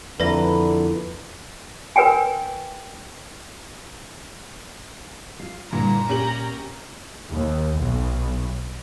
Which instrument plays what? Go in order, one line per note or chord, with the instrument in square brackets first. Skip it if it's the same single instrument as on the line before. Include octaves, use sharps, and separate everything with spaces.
[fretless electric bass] F2 [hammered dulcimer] A#2 E3 [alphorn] D3 [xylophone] B4 D5 A#6
[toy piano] A#4 B4 C#5 G5 G#5
[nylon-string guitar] F4 F5
[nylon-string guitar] G2 D3 E4 [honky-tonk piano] A#2 [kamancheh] A#5
[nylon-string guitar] A#2 [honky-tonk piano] C#4 G4 F#7
[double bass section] D#2
B1